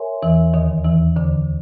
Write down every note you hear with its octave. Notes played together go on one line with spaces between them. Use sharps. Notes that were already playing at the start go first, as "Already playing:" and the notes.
Already playing: A#4 C#5 E5 G#5 C6
E2 E3
D#2 D#3
E2 E3
D2 D3